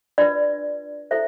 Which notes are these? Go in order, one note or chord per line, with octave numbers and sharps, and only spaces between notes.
D4 F4 B4 D5
E4 A4 C5 E5